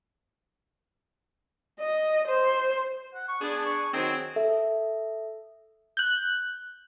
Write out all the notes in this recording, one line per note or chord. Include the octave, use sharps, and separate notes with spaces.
D#5
C5
F#5
C#6
B3 D4 G#4
C#6
D#3 F#3 C4 G#4
A4 E5
F#6 G6